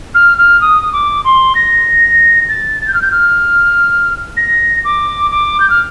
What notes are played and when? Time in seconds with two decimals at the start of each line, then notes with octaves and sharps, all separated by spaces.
0.15 F6
0.38 F6
0.61 D#6
0.93 D6
1.25 C6
1.55 A#6
2.49 A6
2.81 A6
2.88 G6
2.94 F6
3.02 G6
3.11 F6
4.37 A#6
4.85 D6
5.31 D6
5.60 G6
5.70 F6